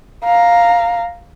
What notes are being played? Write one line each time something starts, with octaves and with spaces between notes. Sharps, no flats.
F5 A#5